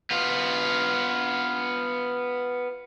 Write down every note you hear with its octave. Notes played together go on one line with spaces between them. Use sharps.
B3 F4